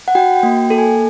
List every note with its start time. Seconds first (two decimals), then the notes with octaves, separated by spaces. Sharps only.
0.08 F#5
0.15 F#4 G5
0.36 G5
0.43 A#3
0.57 G5
0.70 A4
0.78 G#5